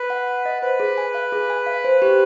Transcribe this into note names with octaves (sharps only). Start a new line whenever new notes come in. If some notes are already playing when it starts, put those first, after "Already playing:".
Already playing: B4
F#5
F#5
D#5
B4 C5
G#4
G#5
F5
G#4
G#5
F5
C5
G4